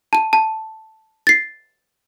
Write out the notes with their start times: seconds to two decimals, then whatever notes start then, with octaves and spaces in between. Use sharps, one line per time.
0.13 A5 D#7
0.33 A5
1.27 A6 C7